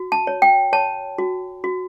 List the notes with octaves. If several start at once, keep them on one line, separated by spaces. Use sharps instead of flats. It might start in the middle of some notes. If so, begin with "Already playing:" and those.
Already playing: F#4
A5
C#5
G5
C#5 A5
F#4
F#4